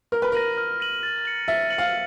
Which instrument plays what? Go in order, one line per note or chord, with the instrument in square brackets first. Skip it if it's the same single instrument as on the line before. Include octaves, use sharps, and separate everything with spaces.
[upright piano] A#4 [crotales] F6
[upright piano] B4
[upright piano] A#4 [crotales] A#6 D#7 F#7
[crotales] F6
A#6 D#7 F#7
A6
C#7 F#7
[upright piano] E5 [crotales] A6
[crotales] C#7 F#7
[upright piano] F5